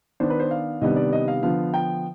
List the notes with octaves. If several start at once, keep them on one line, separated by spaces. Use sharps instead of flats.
D#3 B3 D4 C5
B4
C5
F5
C3 D#3 G3 B3 D4 D#5
D5
D#5
F5
D3 F3 B3 F5
G5